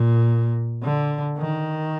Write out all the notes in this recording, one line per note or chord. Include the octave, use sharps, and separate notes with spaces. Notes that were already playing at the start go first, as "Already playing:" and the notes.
Already playing: A#2
D3
D#3